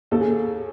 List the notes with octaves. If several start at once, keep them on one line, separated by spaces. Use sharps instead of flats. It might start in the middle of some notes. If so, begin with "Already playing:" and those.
D#2 A4
G#4